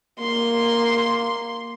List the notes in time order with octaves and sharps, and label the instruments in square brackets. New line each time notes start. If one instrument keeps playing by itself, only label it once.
[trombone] A#3 [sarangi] C6